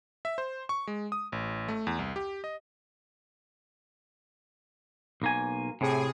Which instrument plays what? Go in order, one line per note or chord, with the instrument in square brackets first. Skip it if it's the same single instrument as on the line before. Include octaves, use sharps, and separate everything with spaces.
[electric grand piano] E5
C5
C#6
G#3
D#6
A1
A3
E2
C2
G4
D#5
[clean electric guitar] B1 A#3 G#5
[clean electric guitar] A2 [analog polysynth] C3 G#4